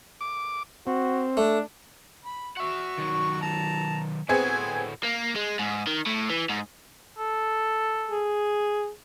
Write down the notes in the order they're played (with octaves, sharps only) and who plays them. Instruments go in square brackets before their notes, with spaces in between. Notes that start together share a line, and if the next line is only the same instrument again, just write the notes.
[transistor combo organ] D6
[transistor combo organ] C4 [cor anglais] F#4
[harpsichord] A3 [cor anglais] D4
[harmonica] B5
[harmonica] F#4 C#6 [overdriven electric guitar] E5 F#5
[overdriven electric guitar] D#3 F#3
[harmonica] A5 A#5
[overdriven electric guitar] A2 F#4 [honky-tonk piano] B3 C4 G#4 [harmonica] G#5
[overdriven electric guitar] A#3
G#3
G#2
D#3
A2
E3
G#2
[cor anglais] A4
[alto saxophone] G#4